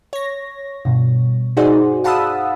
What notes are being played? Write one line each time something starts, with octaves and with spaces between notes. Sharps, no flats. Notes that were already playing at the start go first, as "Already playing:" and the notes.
C#5 A#6
G2 B2
D#4 F#4 G#4 C5 D5
F5 F#5 A5 B5 D#6 E6